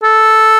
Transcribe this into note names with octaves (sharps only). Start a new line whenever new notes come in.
A4